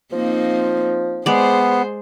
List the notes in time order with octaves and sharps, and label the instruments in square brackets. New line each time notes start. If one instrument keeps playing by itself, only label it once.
[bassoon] F3 [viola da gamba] A#3 C4 D#4
[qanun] G#3 D5 [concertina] B3 [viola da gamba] G#4 C5